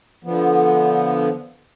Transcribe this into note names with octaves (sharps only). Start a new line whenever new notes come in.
D3 F3 B3